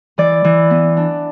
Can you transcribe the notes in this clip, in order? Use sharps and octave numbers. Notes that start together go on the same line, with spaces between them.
E3 D5
E3
B3
D4